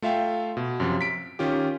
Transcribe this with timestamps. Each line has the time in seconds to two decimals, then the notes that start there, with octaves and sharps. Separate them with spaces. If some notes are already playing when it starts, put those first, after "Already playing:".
0.02 A3 F4 E5 F5 G5
0.57 B2
0.80 F#2 C3 F3
1.01 B6 D7
1.39 D#3 C#4 F4 G4